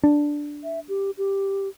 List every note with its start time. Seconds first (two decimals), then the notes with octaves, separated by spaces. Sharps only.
0.04 D4
0.64 E5
0.88 G4
1.18 G4